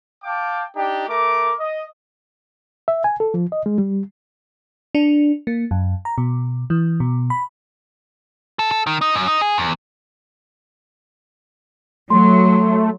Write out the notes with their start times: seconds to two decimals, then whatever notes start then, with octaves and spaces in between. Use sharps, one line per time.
0.23 F5 G5 A5 D6
0.75 D4 D#4 G4
1.07 A3 A#4 D6
1.60 D#5
2.88 E5
3.04 G#5
3.20 A4
3.34 F3
3.52 D#5
3.66 G#3
3.78 G3
4.95 D4
5.47 A#3
5.71 F#2
6.05 A#5
6.18 B2
6.70 E3
7.00 B2
7.30 B5
8.59 A4
8.71 A4
8.87 D#3
9.01 D#4
9.15 F#2
9.28 D#4
9.41 G#4
9.58 E2
12.10 F#3 A3 C6